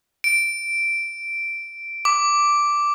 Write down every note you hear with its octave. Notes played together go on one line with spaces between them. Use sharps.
D7
D6